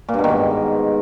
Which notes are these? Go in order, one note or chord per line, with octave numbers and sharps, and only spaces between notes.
A#2
G2
B2
D#3
G#2